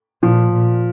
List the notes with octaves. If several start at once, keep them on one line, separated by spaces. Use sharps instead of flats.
A#2 F3
A#2